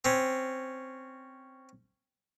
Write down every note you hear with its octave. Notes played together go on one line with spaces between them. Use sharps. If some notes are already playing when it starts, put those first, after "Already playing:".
C4 C#4